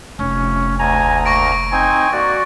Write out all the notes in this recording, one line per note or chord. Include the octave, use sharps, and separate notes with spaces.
F1 C#4
D2 G#5 A#5
A#3 C#6 A#6 D7
C4 D#4 G#5
A#3 F#4 D5